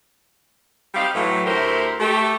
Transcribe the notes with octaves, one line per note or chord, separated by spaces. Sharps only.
G3 C4 D#4 G4 F5
A2 E3 F#3
D2 A3 E4 G4 A#4 C5
A3 G4